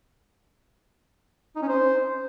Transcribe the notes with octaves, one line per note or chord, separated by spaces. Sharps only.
D#4
C#4
C5